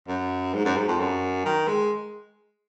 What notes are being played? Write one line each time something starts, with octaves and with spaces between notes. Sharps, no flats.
F#2
G#2
F#2
G#2
F2
F#2
D#3
G#3